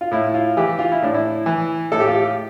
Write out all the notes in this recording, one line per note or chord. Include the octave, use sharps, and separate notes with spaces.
F4
A2 E4
F4
E3 G4
F4
E4
A2 D4
E4
E3
A2 A4
G4
F4
G4